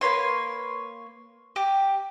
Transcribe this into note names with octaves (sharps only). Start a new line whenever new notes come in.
A#3 B4 C#5 C6
G4